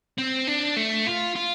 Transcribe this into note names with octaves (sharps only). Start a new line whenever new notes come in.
C4
D4
A3
F4
F4